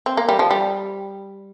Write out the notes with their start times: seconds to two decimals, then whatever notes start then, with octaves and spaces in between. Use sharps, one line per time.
0.06 C4
0.17 A#3
0.29 G3
0.39 F3
0.51 G3